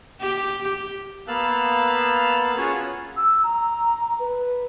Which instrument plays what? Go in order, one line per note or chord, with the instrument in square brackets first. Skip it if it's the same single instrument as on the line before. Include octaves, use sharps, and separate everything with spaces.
[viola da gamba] G4
[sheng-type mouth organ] A#3 B3 F5 A5 E6 F#6
C#4 F4 F#4 G#4 C#5
[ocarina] E6
A#5
B4